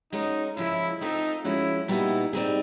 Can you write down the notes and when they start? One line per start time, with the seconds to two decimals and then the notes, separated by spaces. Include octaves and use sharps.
0.13 G#3 C#4 D#4 F#4 A#4
0.57 C#3 F3 G#3 E4
1.01 A3 C4 D#4 F4 A4
1.44 F3 G#3 C#4 E4 F#4
1.88 A#2 G3 B3 D#4 E4 F#4
2.33 G3 C4 D#4 G#4